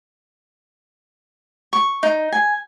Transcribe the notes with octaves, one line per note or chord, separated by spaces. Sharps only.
C#6
D#4
G#5